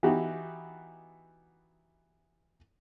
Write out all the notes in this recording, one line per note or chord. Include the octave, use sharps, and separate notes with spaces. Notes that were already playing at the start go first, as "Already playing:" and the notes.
E3 B3 D#4 F#4 G4